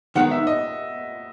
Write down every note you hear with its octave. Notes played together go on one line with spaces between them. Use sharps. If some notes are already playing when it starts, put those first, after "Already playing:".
D#3 G#3 B3 D#4 F#5
E5
D#5